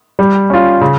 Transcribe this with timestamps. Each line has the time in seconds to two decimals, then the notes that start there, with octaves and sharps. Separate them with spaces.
0.19 G3
0.50 C#4 F4
0.81 C#3